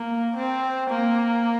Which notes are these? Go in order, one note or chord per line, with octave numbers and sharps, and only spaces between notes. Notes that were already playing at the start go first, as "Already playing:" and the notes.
Already playing: A#3
C4
A#3